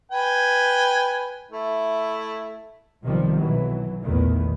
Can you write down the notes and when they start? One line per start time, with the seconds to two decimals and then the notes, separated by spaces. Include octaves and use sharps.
0.11 B4 G5 G#5
1.51 A3 E4
3.03 B1 C3 D#3 F3 G3
3.39 B1 E3 F#3
4.04 A#1 E2 A2 D#3